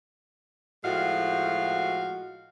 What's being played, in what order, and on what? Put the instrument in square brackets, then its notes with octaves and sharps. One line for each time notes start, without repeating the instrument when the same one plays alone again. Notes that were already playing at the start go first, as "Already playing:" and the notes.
[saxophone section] A2 F3 G#3 F#4 F5